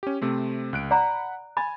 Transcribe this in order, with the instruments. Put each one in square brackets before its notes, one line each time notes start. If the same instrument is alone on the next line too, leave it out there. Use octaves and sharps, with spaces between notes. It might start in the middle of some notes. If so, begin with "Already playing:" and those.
[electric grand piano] C#4 G4
C3 A3 C4
C#2 F#6 D7
[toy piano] D5 A#5 [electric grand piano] F#5 B5
[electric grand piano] G#5 G#6 A6 [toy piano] B5